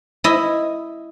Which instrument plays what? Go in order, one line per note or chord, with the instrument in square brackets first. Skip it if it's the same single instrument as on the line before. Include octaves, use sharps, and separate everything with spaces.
[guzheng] E4 D#5